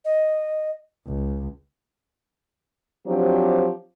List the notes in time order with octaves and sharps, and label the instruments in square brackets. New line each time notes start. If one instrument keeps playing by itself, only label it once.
[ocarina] D#5
[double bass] C#2
[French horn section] F3 F#3 C4 D4 G4